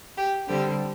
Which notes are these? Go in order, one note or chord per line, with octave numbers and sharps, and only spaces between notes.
G4
D3 G3 C4 G4